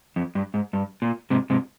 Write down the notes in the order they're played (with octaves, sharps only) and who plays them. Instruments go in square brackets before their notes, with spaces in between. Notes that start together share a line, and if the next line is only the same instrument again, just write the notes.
[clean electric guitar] F2
G2
G#2
G2
A#2
G#2 C3
G#2 C3